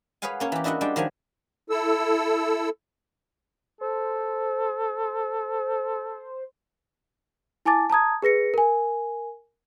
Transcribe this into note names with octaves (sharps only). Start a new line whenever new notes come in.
G#4 B4 C#5 F5 F#5 G#5
A#3 C#4 C#5
E3 G4
D4 E4 F#4 D#5 F#5
G3 G#3 D4 G4 G5
D#3 F3 F#3 G#5
E4 A4 E6
A4 C5
E4 G#5 A5 D6 A6
A5 A#5 D#6 G#6
G#4 B4 A#6 C#7
A#4 G#5